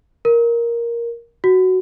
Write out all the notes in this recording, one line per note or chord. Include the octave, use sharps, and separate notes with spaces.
A#4
F#4